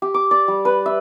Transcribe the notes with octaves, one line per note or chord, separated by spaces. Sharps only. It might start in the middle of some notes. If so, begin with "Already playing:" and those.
G4
D6
D5
G3
B4
E5